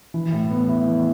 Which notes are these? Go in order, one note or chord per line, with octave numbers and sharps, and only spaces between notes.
E3
A2
B3
E4
E3